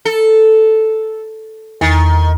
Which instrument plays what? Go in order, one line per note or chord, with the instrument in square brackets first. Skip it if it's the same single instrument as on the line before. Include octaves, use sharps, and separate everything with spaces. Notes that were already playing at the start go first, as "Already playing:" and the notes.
[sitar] A4
[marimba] E2 [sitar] D#3